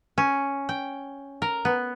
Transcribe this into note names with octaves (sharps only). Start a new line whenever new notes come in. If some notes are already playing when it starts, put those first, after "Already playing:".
C#4
G5
A#4
B3